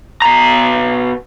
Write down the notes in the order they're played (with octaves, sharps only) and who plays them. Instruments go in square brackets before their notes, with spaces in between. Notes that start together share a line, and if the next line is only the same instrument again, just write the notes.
[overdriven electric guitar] B2 A#5